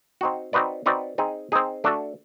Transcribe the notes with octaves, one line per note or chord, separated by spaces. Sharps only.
C4 D#4 F#4
C4 D#4 F#4 B4 D5
C4 D#4 F#4 B4 D5
C4 D#4 G#4
C4 D#4 G#4
A3 D4 F#4 A4